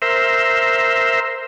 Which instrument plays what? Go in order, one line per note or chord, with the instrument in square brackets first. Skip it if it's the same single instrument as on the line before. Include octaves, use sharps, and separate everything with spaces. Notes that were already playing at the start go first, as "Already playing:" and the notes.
[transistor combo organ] A#4 C5 E5